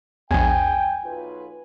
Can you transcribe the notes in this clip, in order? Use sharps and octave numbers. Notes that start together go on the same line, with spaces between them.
A#1 E2 G5 G#5
B1 F4 B4